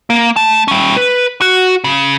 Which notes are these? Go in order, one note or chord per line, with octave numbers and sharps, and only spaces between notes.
A#3
A3 A5
G3 C#4
B4
F#4
C#3